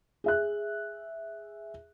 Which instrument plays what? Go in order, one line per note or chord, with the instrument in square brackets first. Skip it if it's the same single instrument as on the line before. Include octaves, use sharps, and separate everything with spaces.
[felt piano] G#4 E5 F#6